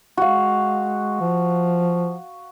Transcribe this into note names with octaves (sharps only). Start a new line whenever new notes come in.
G#3 F#4 F5
F3